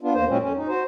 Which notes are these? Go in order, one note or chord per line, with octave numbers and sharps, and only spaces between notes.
B3 D4 F4
E2 A#3 C5
A#2 F#3 G#3 C4 C#4
F2 C#4
D#4
F#4 C5